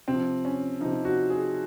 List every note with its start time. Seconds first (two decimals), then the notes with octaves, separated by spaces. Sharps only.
0.08 C3 F3 C4
0.45 C#4
0.81 F3 D#4
0.85 C3
1.05 F#4
1.30 G#4